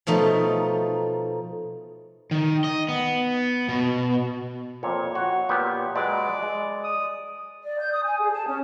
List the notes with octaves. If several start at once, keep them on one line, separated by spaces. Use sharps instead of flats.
B2 F3 A3 D#4
D#3
D#5
B3
B2
F2 A#2 C#5
F#4
A#2 B3 G4
F#3 G#3 B4 D5
G#3
D#6
D5
G6
D#6
G#5
G#4
A5
C#4